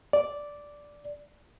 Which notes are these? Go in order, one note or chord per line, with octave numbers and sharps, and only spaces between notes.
D5